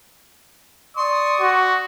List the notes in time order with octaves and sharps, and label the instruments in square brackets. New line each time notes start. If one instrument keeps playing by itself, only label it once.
[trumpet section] D5 C#6 D#6 [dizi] C6
[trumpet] F#4